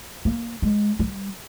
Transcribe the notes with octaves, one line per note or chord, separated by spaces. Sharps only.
A#3
G#3
G3